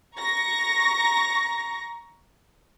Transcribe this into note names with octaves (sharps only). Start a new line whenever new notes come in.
A#5 C#6 A#6